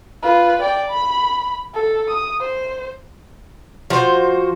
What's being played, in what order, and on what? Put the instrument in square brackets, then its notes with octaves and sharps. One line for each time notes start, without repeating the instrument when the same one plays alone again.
[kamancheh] F4 B4
D5 G5
B5
A4
D#6
C5
[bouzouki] F3 F#4 C5